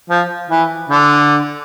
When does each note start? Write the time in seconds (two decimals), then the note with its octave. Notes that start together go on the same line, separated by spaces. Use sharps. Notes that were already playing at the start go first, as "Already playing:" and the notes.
0.10 F3
0.50 E3
0.90 D3